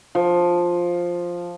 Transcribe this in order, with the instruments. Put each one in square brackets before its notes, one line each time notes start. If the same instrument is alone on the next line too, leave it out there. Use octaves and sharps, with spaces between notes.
[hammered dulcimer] F3